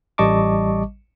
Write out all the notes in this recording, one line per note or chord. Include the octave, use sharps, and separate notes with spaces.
A1 G3 D#5 A5 C#6 D6